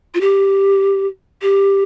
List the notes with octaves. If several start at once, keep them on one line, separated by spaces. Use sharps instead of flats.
F4
G4
G4